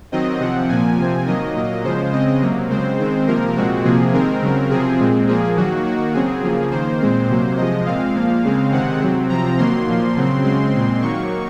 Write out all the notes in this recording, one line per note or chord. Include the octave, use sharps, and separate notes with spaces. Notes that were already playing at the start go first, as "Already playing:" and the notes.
D#3 F#3 C4 D#5
C3 F3 C4 F#5
A#2 F3 A#3 G#5
C3 F3 C4
D#3 F#3 A#3 D#5
A#2 F#3 A#3
C#3 F3 G#3 C5
C#3 G#3 C4 D#5
C3 F#3 A#3
C#3 G#3 C4 C5
D#3 G#3 C4
C3 F3 A#3 A#4
A#2 G#3 C4 F#4
C3 F3 A#3 G#4
D#3 G#3 C4 A#4
C#3 F#3 C4
C3 F3 C4 G#4
A#2 G#3 C4
A#2 F3 A#3 G#4
D#3 F#3 A#3 F#4
D#3 A#3 F#4
C#3 F#3 C4 G#4
C#3 F3 A#3
D#3 A#3 C5
A#2 G#3 C4
C3 F#3 A#3
C3 F3 G#3 D#5
A#2 G#3 C4 F5
A#2 F3 A#3
C#3 G#3 C4
C3 D#3 G#3 C4 F#5
C3 F#3 C4
C3 F3 C4 A#5
D#3 F#3 A#3 C6
A#2 F3 A#3
C#3 F#3 C4
C#3 G#3 C4 C6
A#2 G#3 C4
D#3 F#3 A#3 C#6